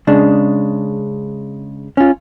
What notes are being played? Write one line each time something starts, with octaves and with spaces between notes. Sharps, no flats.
C#3 G#3 D4
C#4 F4